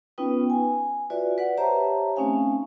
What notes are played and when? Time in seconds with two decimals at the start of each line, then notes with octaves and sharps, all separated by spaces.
0.18 B3 C#4 D#4 F4 B4 G5
0.50 G#5
1.10 F4 F#4 B4 D5 E5
1.38 B4 D5 F#5
1.57 G4 C5 C#5 E5 A5 A#5
2.16 A3 C4 C#4 D#4 F5 G#5